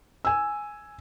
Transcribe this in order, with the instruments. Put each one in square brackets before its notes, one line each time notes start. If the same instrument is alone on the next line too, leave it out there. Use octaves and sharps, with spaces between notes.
[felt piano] G#5 E6